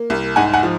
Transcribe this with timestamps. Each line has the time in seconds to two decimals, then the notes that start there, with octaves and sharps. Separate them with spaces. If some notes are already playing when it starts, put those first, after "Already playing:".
Already playing: A#3
0.10 C2
0.36 G#2 F#5 G#5
0.53 F#5 G#5
0.63 F3